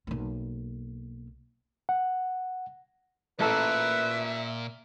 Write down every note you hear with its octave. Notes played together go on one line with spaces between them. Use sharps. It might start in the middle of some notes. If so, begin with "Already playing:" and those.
B1 A#3
F#5
A1 A#2 A4 B4 E5